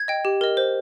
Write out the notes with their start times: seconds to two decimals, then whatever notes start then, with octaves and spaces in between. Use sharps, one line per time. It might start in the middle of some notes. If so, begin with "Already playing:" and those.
Already playing: G#6
0.08 D#5 G5
0.25 G4
0.41 A#4 D#5
0.57 C5